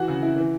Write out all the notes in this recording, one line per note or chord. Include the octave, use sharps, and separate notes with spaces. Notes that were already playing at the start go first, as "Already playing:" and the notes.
Already playing: E3 F#4 F#5
C#3
E4
E3